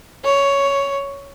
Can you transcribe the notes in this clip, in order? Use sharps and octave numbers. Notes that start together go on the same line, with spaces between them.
C#5